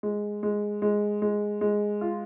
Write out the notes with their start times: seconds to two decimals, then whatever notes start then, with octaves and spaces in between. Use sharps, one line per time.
0.03 G#3
0.43 G#3
0.82 G#3
1.22 G#3
1.61 G#3
2.01 F4